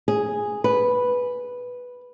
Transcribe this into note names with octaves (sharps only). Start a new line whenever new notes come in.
G#4
B4